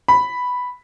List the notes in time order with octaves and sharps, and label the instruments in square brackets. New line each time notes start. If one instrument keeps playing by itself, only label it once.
[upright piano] B5